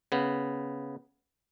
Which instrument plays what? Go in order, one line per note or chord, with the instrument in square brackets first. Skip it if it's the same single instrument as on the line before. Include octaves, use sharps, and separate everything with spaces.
[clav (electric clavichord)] C#3 B3